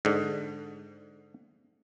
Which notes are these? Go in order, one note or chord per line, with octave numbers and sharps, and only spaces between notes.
G#2 D3